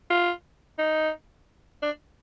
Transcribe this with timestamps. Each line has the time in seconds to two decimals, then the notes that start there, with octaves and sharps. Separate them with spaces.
0.10 F4
0.79 D#4
1.82 D4